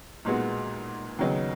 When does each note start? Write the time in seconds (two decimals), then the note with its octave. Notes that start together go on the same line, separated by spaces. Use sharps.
0.25 B1 A#2 G#3 B3 F#4
1.19 D#2 C#3 F#3 B3 D#4